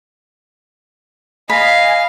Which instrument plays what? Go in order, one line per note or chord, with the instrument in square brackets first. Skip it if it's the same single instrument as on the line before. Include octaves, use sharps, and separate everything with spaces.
[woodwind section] D#5 G#5 [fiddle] F5 [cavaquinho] B5